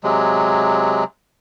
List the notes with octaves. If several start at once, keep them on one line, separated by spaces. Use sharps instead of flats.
C3 F#3 G#3